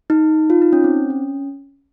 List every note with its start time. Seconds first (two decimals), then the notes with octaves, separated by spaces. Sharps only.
0.10 D#4
0.50 F4
0.62 D#4
0.73 C#4
0.84 C4
1.10 C#4